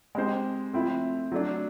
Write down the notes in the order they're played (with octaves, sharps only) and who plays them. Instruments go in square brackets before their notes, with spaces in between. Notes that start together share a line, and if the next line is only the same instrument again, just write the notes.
[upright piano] G#3 C4 D#4 G4 C5
F3 A3 C4 E4
F#3 A3 D4